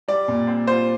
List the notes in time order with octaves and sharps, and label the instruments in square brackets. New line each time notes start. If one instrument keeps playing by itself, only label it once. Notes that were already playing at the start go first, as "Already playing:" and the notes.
[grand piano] G3 [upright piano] D5
[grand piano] A#2
C4
[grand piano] F4 [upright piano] C5